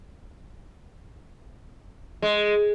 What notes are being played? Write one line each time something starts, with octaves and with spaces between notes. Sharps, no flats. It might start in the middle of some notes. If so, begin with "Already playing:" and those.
G#3